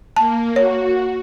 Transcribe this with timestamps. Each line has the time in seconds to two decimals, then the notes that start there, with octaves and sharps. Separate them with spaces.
0.16 A#3 A5
0.56 F#4 C#5